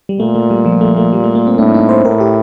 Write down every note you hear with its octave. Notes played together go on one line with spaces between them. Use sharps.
G3
A#2 A3
A3
G3
F3
A3
A3
G3
A3
A#3
C4
A2 D4
D#4
C5
A2 A#4
G4